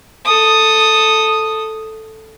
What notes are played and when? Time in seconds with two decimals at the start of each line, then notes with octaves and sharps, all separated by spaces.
0.25 A4 D#6